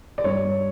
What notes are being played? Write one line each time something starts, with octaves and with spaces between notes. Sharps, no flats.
D5
G2 C#5